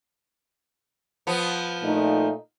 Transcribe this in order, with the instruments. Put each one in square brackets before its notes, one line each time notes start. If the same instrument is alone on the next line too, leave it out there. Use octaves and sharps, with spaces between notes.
[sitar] F3 B3
[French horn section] A#2 A3 D#4